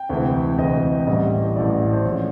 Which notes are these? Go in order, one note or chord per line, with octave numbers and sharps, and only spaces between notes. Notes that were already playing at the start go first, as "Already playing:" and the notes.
Already playing: G5
D2 C3 E3 G#3
D2 C3 E3 G#3 D#5
A1 A2 E3 G3 D#5
A1 A2 E3 G3 D5
C5
A1 A2 F3 G#3 C#5